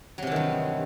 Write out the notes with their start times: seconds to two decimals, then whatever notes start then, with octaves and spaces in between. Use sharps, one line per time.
0.18 F#3
0.22 C3
0.27 E3
0.32 D#3
0.36 G2